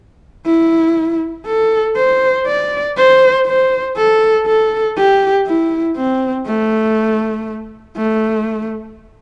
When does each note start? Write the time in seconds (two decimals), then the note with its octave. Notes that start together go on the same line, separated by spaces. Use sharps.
0.46 E4
1.46 A4
1.96 C5
2.47 D5
2.97 C5
3.46 C5
3.96 A4
4.46 A4
4.97 G4
5.46 E4
5.96 C4
6.46 A3
7.96 A3